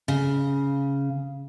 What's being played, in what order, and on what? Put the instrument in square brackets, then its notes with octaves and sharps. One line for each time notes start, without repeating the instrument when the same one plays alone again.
[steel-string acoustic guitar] C#3